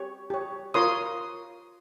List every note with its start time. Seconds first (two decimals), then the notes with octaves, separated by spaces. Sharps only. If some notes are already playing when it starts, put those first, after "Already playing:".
Already playing: G4 C#5
0.30 G4 C#5
0.74 F4 A#4 C#5 C6 D#6